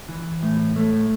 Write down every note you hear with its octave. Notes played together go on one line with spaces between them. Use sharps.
E3
A2
A3